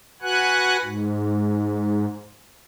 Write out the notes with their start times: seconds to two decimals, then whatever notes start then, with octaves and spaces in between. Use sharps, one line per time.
0.22 F#4 B4 F#5 G#5 F#6
0.82 G#2